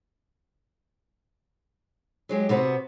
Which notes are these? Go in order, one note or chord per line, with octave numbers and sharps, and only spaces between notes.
F#3 G#3 G4
C3 B3 F#4